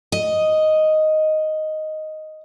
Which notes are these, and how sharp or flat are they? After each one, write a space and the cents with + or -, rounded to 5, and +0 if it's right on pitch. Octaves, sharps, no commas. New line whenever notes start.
D#5 +0